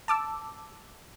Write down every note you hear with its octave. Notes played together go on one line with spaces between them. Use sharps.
A5 D6 E6